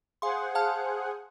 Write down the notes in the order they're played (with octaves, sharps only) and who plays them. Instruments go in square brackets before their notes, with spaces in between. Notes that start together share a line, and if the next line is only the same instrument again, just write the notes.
[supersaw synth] G#4 C5 F#5 [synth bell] F5 C6
[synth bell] F5 A5 F6